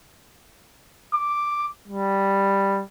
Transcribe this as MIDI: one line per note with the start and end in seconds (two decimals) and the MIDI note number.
1.14 1.66 86
1.88 2.83 55